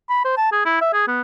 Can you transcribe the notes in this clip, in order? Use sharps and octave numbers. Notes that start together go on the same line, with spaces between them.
B5
C5
A5
G#4
E4
E5
G#4
B3